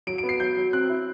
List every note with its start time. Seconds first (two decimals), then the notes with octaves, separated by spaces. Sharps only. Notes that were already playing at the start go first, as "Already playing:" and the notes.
0.07 F#3 D7
0.18 D7
0.23 B3
0.29 C7
0.40 F#3 G6
0.57 F#3
0.73 C4 F#6
0.89 E4